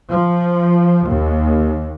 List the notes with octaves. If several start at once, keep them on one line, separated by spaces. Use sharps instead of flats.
F3
D#2